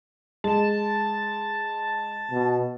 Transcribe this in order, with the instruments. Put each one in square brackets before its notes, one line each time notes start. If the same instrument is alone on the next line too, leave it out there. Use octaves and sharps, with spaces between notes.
[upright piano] G#3 [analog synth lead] A5
[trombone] B2